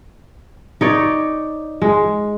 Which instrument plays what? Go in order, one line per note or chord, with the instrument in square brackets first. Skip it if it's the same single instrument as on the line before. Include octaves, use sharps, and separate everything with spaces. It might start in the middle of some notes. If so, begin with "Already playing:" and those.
[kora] D#4 C#5 D5
G#3